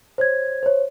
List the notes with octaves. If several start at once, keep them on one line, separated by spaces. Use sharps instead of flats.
C5 C#5 G#6
C5 C#5